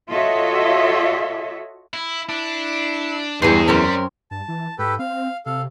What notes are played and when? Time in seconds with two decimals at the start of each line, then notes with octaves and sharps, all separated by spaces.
0.10 F4 F#4 A4 C#5 D#5 E5
1.93 E4
2.29 D4 E4
3.42 E2 G2 E3 D#4 G#4 C6
3.68 F#2 G3 C4 C#4 A#4
4.31 G2 A5
4.48 E3
4.79 G#2 G4 A4 B4
4.99 C4 F5
5.46 C3 A4 F5